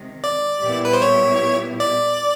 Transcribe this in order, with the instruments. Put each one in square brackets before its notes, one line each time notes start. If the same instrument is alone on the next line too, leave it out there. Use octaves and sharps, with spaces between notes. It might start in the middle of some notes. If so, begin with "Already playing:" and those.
Already playing: [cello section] C3 D#3 G#3
[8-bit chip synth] D5
[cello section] A#2 G3 B3 E4 G4
[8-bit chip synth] B4
C5
C#5
D5